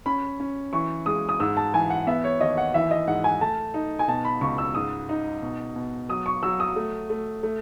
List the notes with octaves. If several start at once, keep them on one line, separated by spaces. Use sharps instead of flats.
C#4 B5
C#4
E3 C#6
G#3 D#6
D#6
G#2 E6
A5
E3 G#5
F#5
B3 E5
C#5
D#2 D#5
F#5
E3 E5
D#5
G#2 F#5
G#5
A3 A5
D#4
G#5
B2 A5
B5
C#2 C#6
E6
G#2 D#6
D#4
B2
B2
F#3 D#6
C#6
F#3 E6
D#6
A3
A3
A3